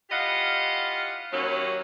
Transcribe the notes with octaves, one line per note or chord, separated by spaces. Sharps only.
E4 F4 G4 D#5 F5 F#5
D#2 F#3 C#4